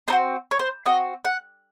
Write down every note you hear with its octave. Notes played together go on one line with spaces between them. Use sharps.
C4 D#4 F#4 C5
C#5
C5
C4 F#4 D#5
F#5